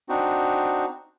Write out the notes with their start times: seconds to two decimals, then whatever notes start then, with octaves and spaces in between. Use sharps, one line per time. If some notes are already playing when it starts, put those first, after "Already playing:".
0.09 C4 D4 D#4 F#4